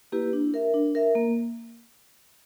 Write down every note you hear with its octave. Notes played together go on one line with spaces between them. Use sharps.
A#3 E4 G4 B4
D4
A#4 E5
D4
A#4 E5
A#3